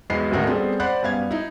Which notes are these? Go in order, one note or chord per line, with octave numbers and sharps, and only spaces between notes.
B1 E2 G#3 D#5 B5 C7
D#1 A1 D2 F#4 A#4 D#5
G3 B3 C4 G#4 A4
C5 D5 F#5 B5 F#6
F#2 G3 B3 F5 G#6
D#4 E4